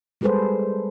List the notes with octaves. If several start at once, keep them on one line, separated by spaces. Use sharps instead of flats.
G3 G#3 G#4 A4 B4 C5